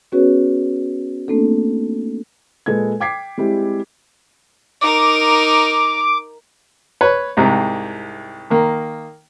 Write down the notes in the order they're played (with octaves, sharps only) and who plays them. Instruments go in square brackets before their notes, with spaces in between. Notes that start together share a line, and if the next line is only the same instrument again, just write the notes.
[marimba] B3 C#4 F#4 G#4 B4 C#5
A3 A#3 C4 D4 A4
[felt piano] A#2 G#3 G#4 A4 B4 G#6
G5 D6 G#6 B6 C7
G3 G#3 C4 E4 G4
[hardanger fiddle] D#4 A#4 [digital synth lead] D6
[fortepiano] B4 C#5
C2 G#2 C3
D#3 A#3